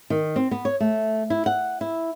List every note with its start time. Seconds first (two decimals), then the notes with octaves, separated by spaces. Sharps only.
0.10 D#3
0.36 C4
0.51 B3
0.65 C#5
0.80 A3
1.30 E4
1.46 F#5
1.81 E4